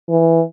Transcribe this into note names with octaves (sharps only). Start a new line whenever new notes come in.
E3